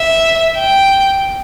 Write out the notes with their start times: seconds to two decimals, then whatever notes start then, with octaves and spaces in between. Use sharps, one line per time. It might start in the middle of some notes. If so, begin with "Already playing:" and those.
Already playing: E5
0.58 G5